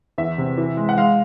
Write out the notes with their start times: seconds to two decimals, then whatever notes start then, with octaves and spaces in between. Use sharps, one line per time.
0.18 E2 E5
0.38 C3
0.58 E3
0.77 G#3
0.89 F#5
0.97 G#3 F5